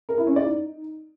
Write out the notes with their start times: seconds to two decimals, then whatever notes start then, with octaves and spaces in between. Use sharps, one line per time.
0.09 A#4
0.18 E4
0.27 C#4
0.36 D5
0.45 D#4